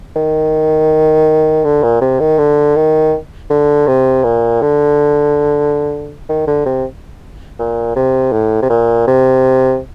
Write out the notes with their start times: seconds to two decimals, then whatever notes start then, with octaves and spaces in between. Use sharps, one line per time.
0.16 D#3
1.64 D3
1.83 A#2
2.01 C3
2.20 D#3
2.38 D3
2.76 D#3
3.50 D3
3.87 C3
4.24 A#2
4.62 D3
6.29 D#3
6.47 D3
6.65 C3
7.59 A#2
7.96 C3
8.33 A2
8.62 C3
8.70 A#2
9.07 C3